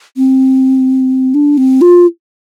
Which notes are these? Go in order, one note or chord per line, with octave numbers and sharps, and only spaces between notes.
C4
D4
C4
F4